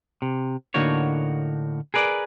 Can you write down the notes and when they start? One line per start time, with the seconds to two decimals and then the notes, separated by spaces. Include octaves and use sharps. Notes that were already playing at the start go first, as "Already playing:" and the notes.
0.22 C3
0.74 A2 D3 A#3 D#4 F#4 C#5
1.94 G#4 A#4 B4 D5